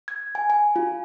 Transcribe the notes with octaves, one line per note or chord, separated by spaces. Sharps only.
G#6
G#5
G#5
F4